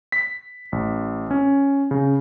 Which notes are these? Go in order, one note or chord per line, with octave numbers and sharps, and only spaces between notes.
B6
A1
C#4
C#3